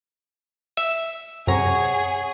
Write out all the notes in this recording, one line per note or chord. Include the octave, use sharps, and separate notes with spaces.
E5
F#2 C3 G#4 C#5 F#5 A#5